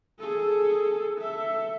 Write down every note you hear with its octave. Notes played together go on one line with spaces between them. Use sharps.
G#4 A4
A4 E5